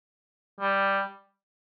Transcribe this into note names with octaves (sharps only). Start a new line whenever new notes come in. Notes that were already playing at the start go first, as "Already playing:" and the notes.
G3